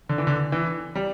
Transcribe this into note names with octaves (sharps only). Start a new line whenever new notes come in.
D3
E3
D3
E3
G3